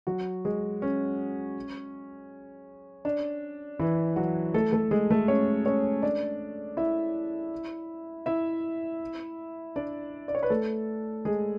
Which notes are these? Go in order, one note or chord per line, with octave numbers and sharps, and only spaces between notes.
F#3 F#4
G#3 G#4
C#4
D4
E3 E4
F#3 F#4
A3 A4
A3 A4
G#3 G#4
A3 A4
C#4 C#5
C#4 C#5
D4 D5
E4 E5
E4 E5
D4 D5
D5
C#5
B4
A3 A4
G#3 G#4